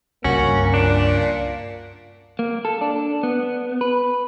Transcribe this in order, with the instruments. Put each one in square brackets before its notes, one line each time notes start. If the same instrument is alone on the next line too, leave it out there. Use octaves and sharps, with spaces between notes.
[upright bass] C#2 G2 [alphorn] A#3 [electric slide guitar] C#4 [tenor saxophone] F#4
[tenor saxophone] A#2 [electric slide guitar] D4
[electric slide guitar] A#3
A4
D4
B3
B4